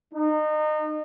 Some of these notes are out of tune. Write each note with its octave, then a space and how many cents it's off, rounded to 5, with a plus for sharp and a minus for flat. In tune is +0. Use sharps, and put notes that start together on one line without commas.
D#4 -30